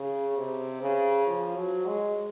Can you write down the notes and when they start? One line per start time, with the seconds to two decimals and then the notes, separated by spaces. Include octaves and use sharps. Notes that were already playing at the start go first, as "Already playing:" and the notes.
Already playing: C#3
0.37 C3
0.81 C#3
1.27 F3
1.56 F#3
1.86 G#3